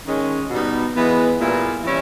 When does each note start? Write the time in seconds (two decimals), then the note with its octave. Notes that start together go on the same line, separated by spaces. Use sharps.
0.06 D#3 G#3 C#4
0.50 B2 G3 B3 D#4
0.95 E3 G#3 B3
1.39 A#2 G3 B3 E4 G#4
1.84 E3 G3 C#4 E4